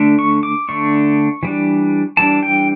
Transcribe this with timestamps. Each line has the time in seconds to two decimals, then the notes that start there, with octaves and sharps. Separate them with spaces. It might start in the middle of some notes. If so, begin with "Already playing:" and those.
Already playing: D3 A3 D4
0.19 C#6
0.43 D6
0.69 D3 A3 D4 C#6
1.43 E3 G3 D4
2.17 E3 G3 D4 A5
2.43 G5